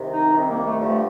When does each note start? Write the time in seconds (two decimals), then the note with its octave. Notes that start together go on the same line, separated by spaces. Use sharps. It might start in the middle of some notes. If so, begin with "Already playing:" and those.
Already playing: C2 C3 D#3
0.11 D#4
0.33 C2 C3 D#3
0.41 C4
0.48 A#3
0.64 A3
0.78 G2 D3 F3 A3